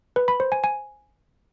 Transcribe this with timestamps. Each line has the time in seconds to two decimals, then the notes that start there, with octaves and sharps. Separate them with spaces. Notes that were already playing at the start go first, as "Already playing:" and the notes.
0.16 B4
0.28 B5
0.40 C5
0.52 G#5
0.64 G#5